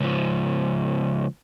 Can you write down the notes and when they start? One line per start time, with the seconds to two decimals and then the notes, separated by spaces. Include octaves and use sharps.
0.01 C#2 F3